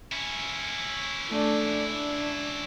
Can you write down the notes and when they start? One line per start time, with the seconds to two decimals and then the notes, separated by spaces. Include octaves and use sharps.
0.12 C#4 E4
1.29 A3 D4
1.90 D4